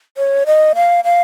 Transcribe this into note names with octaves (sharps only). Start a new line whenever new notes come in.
C#5
D#5
F5
F5